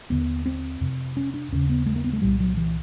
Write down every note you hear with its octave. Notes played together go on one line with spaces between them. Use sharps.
D#2 D3 B3
C4
F2 C3
C#4
D4
D#2 C#3 C#4
B3
A3
A#3
B3
A3
C2 A#2 G3
F#3
E3